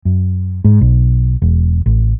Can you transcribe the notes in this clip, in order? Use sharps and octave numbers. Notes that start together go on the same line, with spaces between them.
F#2
G#2
B1
E1
A1